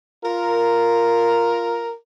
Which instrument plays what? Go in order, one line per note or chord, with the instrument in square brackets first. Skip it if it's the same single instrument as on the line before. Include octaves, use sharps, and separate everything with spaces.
[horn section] F4 A#4